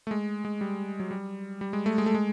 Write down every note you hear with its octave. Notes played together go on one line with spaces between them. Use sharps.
A3
G#3
G#3
G3
F#3
G3
G3
G#3
A3
G#3
A3
G#3